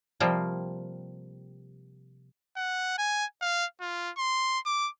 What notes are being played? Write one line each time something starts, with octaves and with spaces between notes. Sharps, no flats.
C3 F3 G3 A#3
F#5
G#5
F5
F4
C6
D6